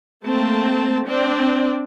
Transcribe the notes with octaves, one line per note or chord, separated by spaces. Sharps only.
A3 A#3 C4 A5
C4 D4 D5